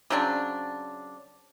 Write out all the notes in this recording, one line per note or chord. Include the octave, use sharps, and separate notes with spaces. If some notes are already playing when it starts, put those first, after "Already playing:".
C#3 F#3 C4 D4